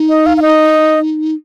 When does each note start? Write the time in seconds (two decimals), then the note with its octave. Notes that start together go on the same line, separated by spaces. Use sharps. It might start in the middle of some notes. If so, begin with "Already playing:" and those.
Already playing: D#4
0.09 D#5
0.26 F5
0.37 F5
0.42 D#5